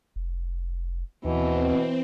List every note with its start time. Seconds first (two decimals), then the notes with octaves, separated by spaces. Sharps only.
0.16 F1
1.25 D#2 B2 E3 C4